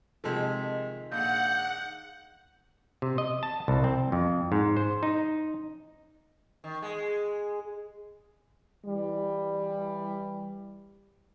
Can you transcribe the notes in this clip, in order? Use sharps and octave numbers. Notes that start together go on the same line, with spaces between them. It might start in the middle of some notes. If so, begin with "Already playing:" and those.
C3 D#3 F3 G#3 A4
A#1 F#5 G6
C3
D#5
A5
C2
C4
F2
G#2
C5
D#4
D#3
G#3
E3 G3